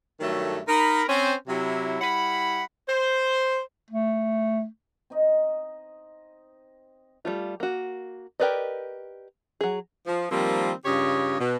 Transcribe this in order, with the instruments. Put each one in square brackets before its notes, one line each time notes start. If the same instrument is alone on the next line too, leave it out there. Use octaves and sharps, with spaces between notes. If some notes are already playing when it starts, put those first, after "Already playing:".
[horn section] G2 D#3 F#3 A3
D#4 A#4 B5
C4 C#4 C5
C3 F#3 E4
G3 E4 F#5 B5
C5
[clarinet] A3
[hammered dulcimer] C4 D#4 D#5
[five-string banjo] G3 A3 F4
A#3 F#4
G4 A#4 B4 D5 D#5
F#3 G#4
[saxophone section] F3
D#3 F3 G3 A#3 C4
G2 C#3 F4 G4 C#5 D#5
B2